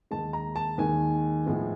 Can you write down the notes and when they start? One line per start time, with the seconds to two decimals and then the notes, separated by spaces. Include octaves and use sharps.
0.11 D#2 D#3 G#3 A5
0.33 A#5
0.56 A5
0.78 D#2 D#3 G#3 G#5
1.46 A2 F3 G#3 B3